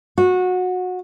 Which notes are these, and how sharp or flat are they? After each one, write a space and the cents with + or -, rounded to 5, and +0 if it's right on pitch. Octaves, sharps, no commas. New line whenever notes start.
F#4 -20